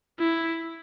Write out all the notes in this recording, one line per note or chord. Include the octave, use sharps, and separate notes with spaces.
E4